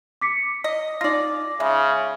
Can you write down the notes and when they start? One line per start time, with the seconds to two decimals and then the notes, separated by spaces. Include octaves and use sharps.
0.21 D6 B6 C#7
0.64 D#5
1.01 D#4 F4 D5 A#6
1.60 C#3 G#3 E5